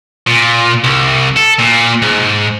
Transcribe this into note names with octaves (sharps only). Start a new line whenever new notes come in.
A#2
C2
A4
A#2
G#2